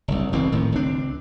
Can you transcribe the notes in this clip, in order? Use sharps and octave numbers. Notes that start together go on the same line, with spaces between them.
F#1 C2
F#1 B1 E3 C4
F1 A2 D#3
C#2 C4 D4